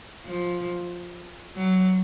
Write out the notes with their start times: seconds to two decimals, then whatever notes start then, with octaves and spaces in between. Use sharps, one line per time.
0.26 F3
1.57 F#3